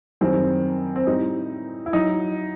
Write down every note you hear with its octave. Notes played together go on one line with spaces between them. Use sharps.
F#2 D#3 G3 C4
C4
A2 G3 D#4
E4
F#3 D#4